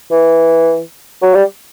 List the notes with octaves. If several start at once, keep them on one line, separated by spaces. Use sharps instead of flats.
E3
F#3
G3